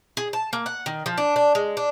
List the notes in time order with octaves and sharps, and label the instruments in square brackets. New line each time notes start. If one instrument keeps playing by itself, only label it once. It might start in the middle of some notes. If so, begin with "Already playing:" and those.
[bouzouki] G#4
A5
A#3
F#5
D#3
F3
D4
D4
G#3
D4